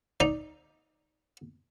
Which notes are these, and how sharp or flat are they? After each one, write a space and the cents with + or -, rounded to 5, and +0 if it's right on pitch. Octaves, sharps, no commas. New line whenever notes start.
D#4 +0 D5 +0